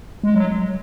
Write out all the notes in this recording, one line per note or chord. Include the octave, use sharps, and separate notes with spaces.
G#3
F#3